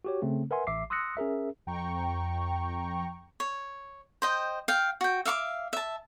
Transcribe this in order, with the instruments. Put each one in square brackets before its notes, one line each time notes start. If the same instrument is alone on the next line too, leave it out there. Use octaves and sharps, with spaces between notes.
[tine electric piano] F#4 G4 C#5
C#3 A3 C4
A#4 B4 E5 F#5 G#5 C6
A1 E5 D6 C7
C6 D#6 E6 F#6 A#6 C#7
C#4 G#4 A#4 E5
[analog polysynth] F2 G5 A#5 C#6
[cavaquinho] C#5
C5 D#5 G5
F5 G5
F#4 G5
E5 F5 C#6 D6
E5 A5